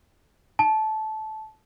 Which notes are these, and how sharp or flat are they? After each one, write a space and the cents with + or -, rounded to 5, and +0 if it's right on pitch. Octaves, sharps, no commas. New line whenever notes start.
A5 -15